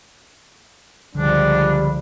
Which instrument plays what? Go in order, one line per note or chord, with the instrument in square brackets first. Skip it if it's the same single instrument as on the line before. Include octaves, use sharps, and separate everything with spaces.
[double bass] C#2 F3 [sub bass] D3 [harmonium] G3 [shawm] D4